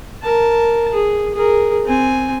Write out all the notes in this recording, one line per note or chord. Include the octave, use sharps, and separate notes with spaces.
A#4 A5
G#4
G#4 A#4
C4 G#5